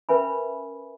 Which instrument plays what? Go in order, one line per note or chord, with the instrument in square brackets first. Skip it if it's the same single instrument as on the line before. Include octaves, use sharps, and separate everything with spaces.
[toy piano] C#4 A#4 B4 E5 G#5 B5